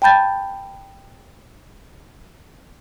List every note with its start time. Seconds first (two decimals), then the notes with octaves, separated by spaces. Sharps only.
0.02 G5 A5 B5 G6 A6